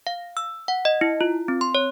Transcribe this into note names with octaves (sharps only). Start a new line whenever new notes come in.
F5
E6
F#5
D#5
E4
F4
C4
C6
C#5